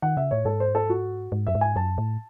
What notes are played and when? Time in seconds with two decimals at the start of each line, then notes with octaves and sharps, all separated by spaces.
0.02 D#3 F#5
0.17 C#3 E5
0.31 A2 C#5
0.45 G#2 A4
0.60 C5
0.75 A4
0.90 F#4
1.32 G#2
1.47 F#2 E5
1.55 G#2
1.61 G#5
1.76 F#2 A5
1.98 A2